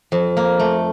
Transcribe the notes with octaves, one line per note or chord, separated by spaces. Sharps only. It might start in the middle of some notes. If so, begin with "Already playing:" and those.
F2
A#3
A3